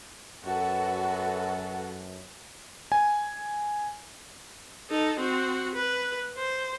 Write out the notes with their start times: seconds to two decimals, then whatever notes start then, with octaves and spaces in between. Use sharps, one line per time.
0.45 F#2 F#4 A4 B4 F#5
2.92 G#5
4.90 D#4 A4
5.19 C4 F#4
5.75 B4
6.38 C5